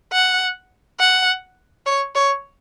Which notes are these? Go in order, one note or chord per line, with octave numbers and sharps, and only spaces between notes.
F#5
F#5
C#5
C#5